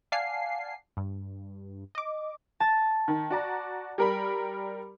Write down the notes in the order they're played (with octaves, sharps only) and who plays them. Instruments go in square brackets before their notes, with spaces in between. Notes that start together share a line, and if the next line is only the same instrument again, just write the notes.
[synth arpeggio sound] D5 F5 F#5 G#5 A5 C7
G2
D#5 D6
[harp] A5 A6
[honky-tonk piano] D#3
F#4 D5 A#5
G3 A#4 B5